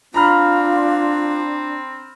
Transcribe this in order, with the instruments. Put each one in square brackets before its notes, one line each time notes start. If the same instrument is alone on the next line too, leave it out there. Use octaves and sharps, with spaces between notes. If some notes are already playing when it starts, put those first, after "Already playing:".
[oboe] C4 [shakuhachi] D4 [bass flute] F4 [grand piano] A#5 B5 F6